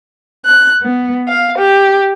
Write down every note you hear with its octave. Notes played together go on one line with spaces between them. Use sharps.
F#6
B3
F5
G4